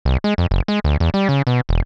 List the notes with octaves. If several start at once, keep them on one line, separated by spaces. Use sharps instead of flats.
C2
G#3
F2
F#1
G#3
D2
E2
G3
C#3
B2
E1